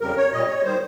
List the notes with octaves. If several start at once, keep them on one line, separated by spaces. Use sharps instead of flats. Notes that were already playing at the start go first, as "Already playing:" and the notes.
F2 C#3 G3 A#4
C#5
A#2 G3 D#5
C#5
D#3 G3 C5